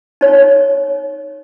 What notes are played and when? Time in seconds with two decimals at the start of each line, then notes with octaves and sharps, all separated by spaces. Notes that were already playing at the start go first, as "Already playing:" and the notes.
0.21 D#4 C#5